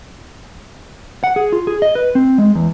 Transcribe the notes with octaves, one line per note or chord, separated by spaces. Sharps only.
F#5
G#4
F4
G#4
D#5
B4
C4
G#3
E2